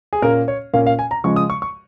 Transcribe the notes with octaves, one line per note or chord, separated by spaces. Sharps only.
G#4
A#2 A#3 C#4 A#4
C#5
A#2 A#3 C#4 F5
F5
G#5
A#5
C#3 F3 G#3 C#6
D#6
C#6
C#6